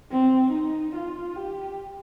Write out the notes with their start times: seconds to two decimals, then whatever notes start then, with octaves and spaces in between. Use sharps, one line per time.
0.11 C4
0.52 D#4
0.95 F4
1.36 G4